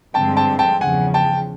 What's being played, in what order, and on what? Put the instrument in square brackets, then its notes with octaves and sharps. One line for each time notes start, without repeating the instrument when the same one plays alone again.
[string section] G2 D3 F3 G#3 C4 [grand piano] G5 A5
[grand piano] G5 A5
G5 A5
[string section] E2 C#3 F3 [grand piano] F#5 G#5
[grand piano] G5 A5